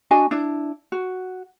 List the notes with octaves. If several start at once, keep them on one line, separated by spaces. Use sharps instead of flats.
D4 F#4 D#5 G#5
D4 E4
F#4